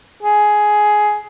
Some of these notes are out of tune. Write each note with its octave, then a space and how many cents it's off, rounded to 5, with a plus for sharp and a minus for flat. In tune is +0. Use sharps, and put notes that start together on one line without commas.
G#4 +10